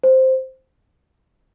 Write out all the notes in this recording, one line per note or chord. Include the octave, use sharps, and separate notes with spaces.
C5